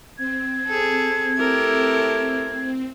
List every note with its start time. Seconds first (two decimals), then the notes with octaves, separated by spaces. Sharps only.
0.18 C4 G#6
0.66 G#4 A4
1.39 A3 E4 G4 A4 A#4